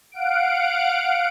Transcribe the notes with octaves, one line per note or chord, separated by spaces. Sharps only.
F5 F#5 D7